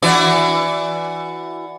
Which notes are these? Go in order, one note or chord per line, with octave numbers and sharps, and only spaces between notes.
E3 F#4 D5